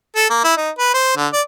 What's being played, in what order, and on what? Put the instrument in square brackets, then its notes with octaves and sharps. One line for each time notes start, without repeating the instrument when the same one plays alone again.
[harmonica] A4
A#3
E4
D#4
B4
C5
D3
D5